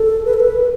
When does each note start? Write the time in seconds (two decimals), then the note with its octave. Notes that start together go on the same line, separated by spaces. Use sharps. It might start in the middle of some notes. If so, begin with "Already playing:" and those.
Already playing: A4
0.25 B4
0.34 A4
0.40 B4